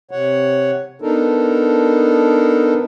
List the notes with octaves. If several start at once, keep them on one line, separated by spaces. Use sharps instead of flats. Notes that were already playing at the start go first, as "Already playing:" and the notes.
C3 C#5 F#5
B3 D4 D#4 A4 A#4